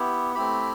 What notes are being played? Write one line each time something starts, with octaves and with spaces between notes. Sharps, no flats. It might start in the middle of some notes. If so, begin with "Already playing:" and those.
Already playing: B3 E4 G4
A3 C4 E4 G4 B5